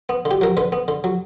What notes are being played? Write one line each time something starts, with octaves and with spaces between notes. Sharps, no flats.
B3
D3
G4
F#3 A#4
D3 B4
B3
D3
F#3